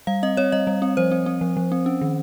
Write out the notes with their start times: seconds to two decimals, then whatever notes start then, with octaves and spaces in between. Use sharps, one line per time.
0.07 G3 F5
0.23 C4 D#5
0.37 C4 C#5
0.52 G3 D#5
0.67 G3
0.82 C4
0.97 F3 C5
1.11 C4
1.26 C4
1.41 F3
1.57 F3
1.72 C4
1.86 C#4
2.02 D#3